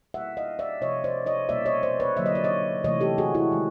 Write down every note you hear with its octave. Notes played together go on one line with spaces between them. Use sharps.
B2 G3 A#3 E5 F#5
D#5 F5
D5 E5
C3 F3 A3 C#5 D#5
C5 D5
C#5 D#5
B2 G3 A#3 D5 E5
C#5 D#5
C5 D5
B4 C#5
D3 F#3 A#3 E5
D#5
D5
C#5 D#5
C3 E3 A3 C#5 D#5
G4 A4
F#4 G#4
E4 F#4
D#3 G#3